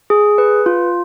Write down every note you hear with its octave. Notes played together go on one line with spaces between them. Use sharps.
G#4
B4
F4